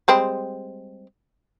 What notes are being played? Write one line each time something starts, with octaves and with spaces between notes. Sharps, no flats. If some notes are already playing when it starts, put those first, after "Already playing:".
G3 G#3 C4